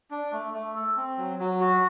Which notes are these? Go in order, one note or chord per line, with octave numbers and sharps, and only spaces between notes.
D4
A3
A3
A4
C4
F#3
F#3
F#4